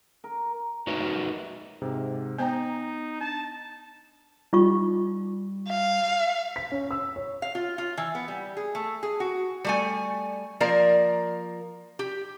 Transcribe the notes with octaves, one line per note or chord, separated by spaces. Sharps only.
A#4
D#4 F#4 A#4 B4 C#5 E5
G#2 C3
B3 D#4 C5 G5 A#5 G6
D4 A5
G3 D#4 F4 C#6
F5
B6
C#4
E6
C#5
F5
F4
F4
E3
B3
G3
G#4
A3
G#4
F#4
G3 A3 G#5
F3 A#3 A#4 D5
G4